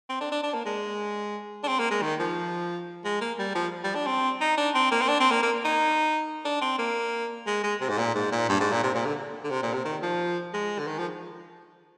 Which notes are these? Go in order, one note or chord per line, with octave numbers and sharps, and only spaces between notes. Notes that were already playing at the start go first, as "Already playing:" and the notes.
C4
D4
D4
D4
A#3
G#3
D4
C4
A#3
G#3
D#3
F3
G#3
A#3
G3
F3
G3
D4
C4
D#4
D4
C4
A#3
C4
D4
C4
A#3
A#3
D#4
D4
C4
A#3
G#3
G#3
C3
G#2
A#2
G#2
A#2
G2
G#2
A#2
C3
A#2
D3
D3
C3
A#2
C3
D#3
F3
G#3
D3
D#3
F3